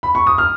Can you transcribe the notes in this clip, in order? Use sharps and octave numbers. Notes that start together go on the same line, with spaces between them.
B5
C#6
D#6
F6